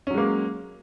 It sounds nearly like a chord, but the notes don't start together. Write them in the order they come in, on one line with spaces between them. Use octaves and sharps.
C#4 F#3 G#3 A#3